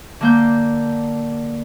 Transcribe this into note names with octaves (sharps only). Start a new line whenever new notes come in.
D3 A#3 G6